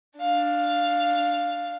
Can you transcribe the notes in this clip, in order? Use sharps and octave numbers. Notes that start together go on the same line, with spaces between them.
D4 F5